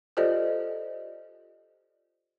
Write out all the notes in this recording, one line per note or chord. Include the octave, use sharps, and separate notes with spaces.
F4 G4 A4 C5 D5 D#5